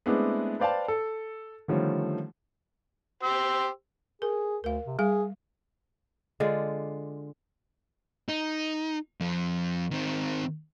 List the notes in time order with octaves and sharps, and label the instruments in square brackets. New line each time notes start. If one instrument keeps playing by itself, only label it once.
[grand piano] G#3 A3 B3 C4 D4 E4
B4 C5 D5 F5 G5 A5
A4
D3 D#3 F3 G3 A3 C#4
[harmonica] G4 C5 E6
[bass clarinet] G#4 [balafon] A#4
[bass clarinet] D2 [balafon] A#4 F5
[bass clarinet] C3
[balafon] G3 F5 [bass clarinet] G#4
[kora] D3 G#3 F4 D5
[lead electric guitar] D#4
F2 F3
D#3 C4